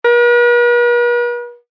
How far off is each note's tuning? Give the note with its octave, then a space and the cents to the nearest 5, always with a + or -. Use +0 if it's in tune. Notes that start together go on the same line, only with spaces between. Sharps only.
B4 -45